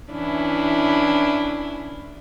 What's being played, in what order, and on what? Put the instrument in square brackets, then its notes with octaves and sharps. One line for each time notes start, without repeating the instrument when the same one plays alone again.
[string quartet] E3 C#4 D4 E4